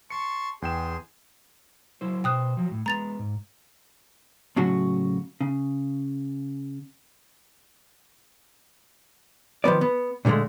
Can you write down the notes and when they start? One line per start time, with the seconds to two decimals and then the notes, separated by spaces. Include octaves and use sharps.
0.10 A5 C6 C#6 C#7
0.62 E2 G#4 G5 C6 E7
2.01 F#3 E4 C5
2.24 B2 C5 G5 D#6 F#6
2.57 F3 F#3
2.71 A2
2.86 G#3 B3 A#5 A6 F7
3.19 G#2
4.56 A2 C#3 F#3 F#4
5.41 C#3
9.64 D#3 F3 B3 D5
9.81 B3
10.25 A#2 D3 F3 G#3 A3